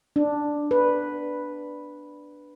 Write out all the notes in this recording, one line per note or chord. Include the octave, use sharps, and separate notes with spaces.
D4
B4